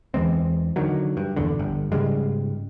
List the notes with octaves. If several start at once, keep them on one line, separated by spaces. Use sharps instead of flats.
E2 E3 G#3 C4
D3 D#3 F#3
G2
A#1 E2 D3
G1
G#2 C#3 G3 G#3